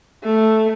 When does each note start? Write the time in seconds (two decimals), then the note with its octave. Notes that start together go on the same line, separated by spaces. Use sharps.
0.24 A3